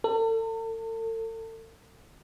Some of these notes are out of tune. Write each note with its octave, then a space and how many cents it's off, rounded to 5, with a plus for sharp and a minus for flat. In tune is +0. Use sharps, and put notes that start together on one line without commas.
A4 +40